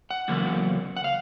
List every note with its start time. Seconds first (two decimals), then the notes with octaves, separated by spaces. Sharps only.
0.11 F#5
0.28 E2 C#3 F#3 A#3
0.97 F#5
1.04 F5